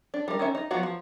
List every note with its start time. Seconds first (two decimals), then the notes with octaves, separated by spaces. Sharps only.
0.14 D4
0.28 G3 A#4
0.39 D#3 C#4 E5
0.55 D#4
0.71 F3 F#3 B3 F4 F#4
0.83 F3